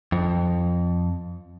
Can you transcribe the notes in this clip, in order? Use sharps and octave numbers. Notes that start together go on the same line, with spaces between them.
F2